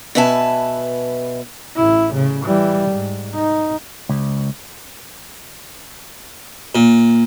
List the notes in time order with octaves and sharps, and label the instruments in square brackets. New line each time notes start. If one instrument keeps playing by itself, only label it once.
[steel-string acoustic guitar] B2 B4 E5 G#5 A5
[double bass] A1 E4
C#3
E3 G3
G#2
D#4
[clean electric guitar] C#2
[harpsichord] A#2